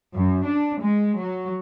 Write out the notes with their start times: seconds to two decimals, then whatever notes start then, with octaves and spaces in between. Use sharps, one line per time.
0.15 F#2
0.46 D4
0.81 G#3
1.20 F#3